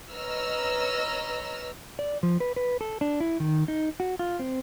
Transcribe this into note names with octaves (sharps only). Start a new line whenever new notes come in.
B4 C#5 D#5 A#5 E6 F6
D5
F3
B4
B4
A4
D4
E4
D#3
D#4
F#4
F4
C4